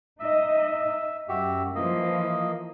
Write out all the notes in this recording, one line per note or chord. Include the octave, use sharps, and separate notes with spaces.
D#4 D#5 E5
F#2 F#4 G4 E5
E3 F3 A#3 D#5